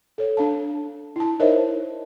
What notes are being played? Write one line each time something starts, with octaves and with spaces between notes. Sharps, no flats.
A4 C#5
D4 F5 A5
E4 A5
D#4 A#4 C5 C#5 D#5 E5